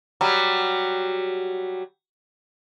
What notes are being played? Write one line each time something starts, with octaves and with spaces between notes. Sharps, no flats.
F#3 G3